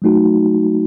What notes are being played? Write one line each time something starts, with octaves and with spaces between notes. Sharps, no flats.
F#3 A3 D#4 F#4